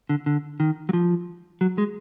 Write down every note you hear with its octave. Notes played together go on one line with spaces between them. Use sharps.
D3
D3
D#3
F#3
F3
F#3
G#3